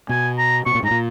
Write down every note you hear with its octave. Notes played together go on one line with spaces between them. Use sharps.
B2 G#5
A#5
B2 C#6
A#2
G#2 A#5
A#2